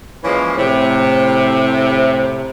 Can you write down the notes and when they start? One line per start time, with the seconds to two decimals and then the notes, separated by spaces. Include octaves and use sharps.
0.24 E3 F3 G#3 A#3 C#4
0.58 A2 C3